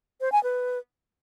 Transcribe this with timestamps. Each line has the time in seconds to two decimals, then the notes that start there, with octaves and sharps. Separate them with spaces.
0.21 C5
0.32 G#5
0.43 B4